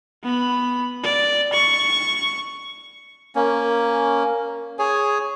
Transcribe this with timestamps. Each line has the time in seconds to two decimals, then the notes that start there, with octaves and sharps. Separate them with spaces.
0.24 B3 B5
1.04 D5
1.53 C#6
3.35 A#3 C#4
4.79 G#4 C#5 G#5